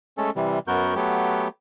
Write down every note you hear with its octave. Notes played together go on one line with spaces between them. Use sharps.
G#3 A3 C#4 A4
C3 E3 G3
F#2 B3 F#4 A#4 G6
F#3 A3 B3 G4